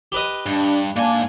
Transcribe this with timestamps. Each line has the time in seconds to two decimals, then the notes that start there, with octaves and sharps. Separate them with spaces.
0.12 G4 B4 D#5
0.46 G2 D4
0.96 G#2 A#3 D4 G#5